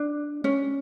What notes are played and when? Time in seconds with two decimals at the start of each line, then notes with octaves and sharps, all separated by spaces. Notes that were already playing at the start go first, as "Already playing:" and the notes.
Already playing: D4
0.44 C#4